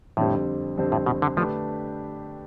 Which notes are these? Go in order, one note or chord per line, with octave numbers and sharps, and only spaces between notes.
F2 A2 D3 G3 C4
F2 D3 G3 C4
A2
B2
D3
D3 F3 A3 D4 G4 B4